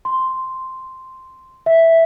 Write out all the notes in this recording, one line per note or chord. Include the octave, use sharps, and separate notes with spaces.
C6
E5